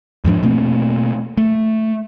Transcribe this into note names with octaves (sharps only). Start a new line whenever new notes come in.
E2 G#2 F3 D4
B2 A3 A#3 C4
A3